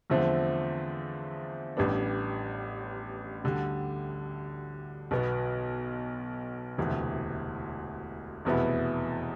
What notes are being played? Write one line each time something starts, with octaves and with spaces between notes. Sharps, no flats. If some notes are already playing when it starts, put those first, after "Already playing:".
E2 D3 F3 A3 C4
A1 A2 G3 B3 D4
D2 D3 G3
B1 B2 B3
E1 D2 C3 E3
F1 E2 B2 B3 E4